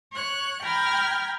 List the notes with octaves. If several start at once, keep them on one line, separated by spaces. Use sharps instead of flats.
C#5 F#6
G5 A#5 B5 F6 G#6